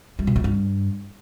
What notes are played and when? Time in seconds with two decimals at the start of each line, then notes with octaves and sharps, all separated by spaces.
0.19 G3
0.27 B2
0.36 G3
0.44 G2